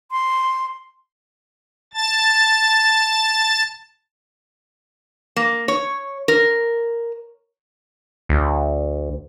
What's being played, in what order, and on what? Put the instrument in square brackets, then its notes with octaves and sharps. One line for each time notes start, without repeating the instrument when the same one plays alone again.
[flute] C6
[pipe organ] A5 A6
[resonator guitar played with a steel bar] A#3
C#5
A#4
[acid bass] D2